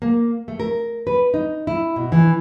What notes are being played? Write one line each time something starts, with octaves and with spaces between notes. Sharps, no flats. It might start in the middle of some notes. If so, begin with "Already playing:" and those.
A#3
A3
A#4
B4
D#4
E4
B2
E3